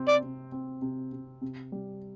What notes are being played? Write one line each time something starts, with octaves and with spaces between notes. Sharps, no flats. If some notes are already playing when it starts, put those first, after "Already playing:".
Already playing: C3 C4
D5
C3
C4
C3
C3
C3
G3